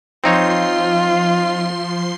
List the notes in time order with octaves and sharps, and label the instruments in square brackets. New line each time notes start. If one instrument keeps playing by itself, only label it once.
[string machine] F3 C6 C7 [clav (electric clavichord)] C4 D#4 C#5 [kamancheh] F4